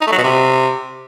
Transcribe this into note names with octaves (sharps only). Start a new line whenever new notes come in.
D#4
A3
F#3
B2
C3